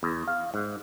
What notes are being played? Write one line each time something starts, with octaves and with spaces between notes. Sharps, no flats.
E2
F5
G#2